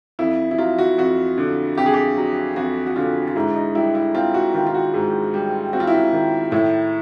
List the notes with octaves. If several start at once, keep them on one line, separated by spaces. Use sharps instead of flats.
F2 E4
E4
F#3 F4
F#4
F2 F#4
D3
F2 G4
G#4
G4
F#3
F2 F#4
F#4
D3 F4
F4
G#2 E4
D#4
G3 E4
E4
C4 F4
F#4
D#3 F4
F4
F#4
G#2
G3
C4 F#4
F4
E4
F4
D#3
A2 E4